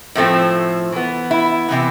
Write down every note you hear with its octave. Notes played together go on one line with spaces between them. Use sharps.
A2 F3 A3 C4
E3 B3
E4
C3 E3 B3